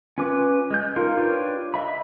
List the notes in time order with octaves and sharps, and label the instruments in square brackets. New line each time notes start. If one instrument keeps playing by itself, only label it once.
[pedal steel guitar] C#4 F4 B4 D6
G#3 G6
D#4 F4 A#4
D4 F4 G4 B4 C#5
D#5 E5 B5